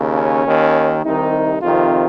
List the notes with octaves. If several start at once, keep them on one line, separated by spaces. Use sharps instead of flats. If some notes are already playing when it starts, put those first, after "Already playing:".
Already playing: D#2 C#3
C#4
D#2 D#3
C2 C3 D#3 D#4
F2 C3 D#3 F4